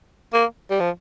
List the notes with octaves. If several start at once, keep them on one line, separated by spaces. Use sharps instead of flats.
A#3
G3
F3